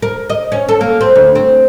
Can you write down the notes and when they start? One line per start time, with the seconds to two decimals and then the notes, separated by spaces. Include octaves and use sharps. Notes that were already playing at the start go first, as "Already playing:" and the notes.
0.02 A#4
0.30 D#5
0.52 C#4
0.69 A4
0.81 A#3
1.01 C4
1.16 D2
1.35 C4